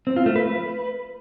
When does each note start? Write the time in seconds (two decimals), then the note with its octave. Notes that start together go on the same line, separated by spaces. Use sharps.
0.07 C4
0.16 F4
0.26 A3
0.36 B4